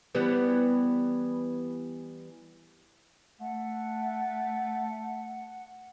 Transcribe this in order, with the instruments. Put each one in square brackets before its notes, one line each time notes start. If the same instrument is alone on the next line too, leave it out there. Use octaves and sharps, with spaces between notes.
[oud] E3 G3 B3
[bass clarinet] A3 [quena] F#5